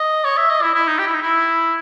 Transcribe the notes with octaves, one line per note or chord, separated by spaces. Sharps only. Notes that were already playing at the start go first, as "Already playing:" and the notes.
Already playing: D#5
C#5
E5
D#5
E4
E4
D#4
G4
E4
D#4
E4